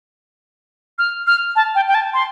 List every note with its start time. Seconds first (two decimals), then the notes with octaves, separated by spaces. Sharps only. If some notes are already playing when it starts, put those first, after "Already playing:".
0.99 F6
1.27 F6
1.56 A5
1.75 G5
1.88 G5
1.95 A5
2.14 C6